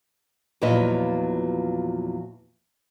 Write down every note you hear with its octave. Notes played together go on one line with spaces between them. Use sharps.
E2 A#2 F3 F#3 B4 D#5